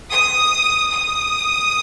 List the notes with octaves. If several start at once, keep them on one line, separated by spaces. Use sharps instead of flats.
D#6
D#6